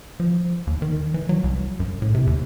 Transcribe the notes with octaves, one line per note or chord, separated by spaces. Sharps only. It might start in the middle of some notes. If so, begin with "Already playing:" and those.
F3
D#2
D#3
E3
F#3
C2
F#2
A2
C3
D#2